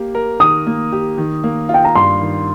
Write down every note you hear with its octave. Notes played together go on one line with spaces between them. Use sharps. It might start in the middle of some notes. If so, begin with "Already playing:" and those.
Already playing: A#3 G4
A#4
D#3 D#6
A#3
G4
D#3
A#3
F4
G5
A#5
G2 C6
D#3